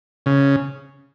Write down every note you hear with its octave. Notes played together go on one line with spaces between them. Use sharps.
C#3